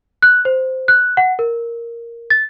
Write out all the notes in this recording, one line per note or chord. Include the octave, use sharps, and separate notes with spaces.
F#6
C5
F#6
F#5
A#4
A6